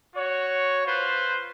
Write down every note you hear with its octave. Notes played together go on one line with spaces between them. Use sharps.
F#4 C#5
F4 B4 C5